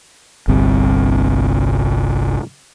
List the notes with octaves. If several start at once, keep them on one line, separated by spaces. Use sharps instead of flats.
G1 C2 C3